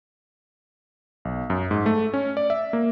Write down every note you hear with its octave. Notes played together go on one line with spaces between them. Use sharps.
B1
F#2
G#2
A3
C#4
D5
E5
A#3